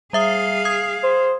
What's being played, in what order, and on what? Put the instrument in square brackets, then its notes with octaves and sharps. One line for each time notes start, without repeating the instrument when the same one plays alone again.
[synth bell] G3 E5 D#6 [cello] G#4 F5
[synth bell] D#6 G#6
[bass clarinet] C5